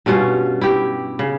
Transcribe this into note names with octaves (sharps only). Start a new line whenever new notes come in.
G2 B2 C#4 F4
E4 G4
C#3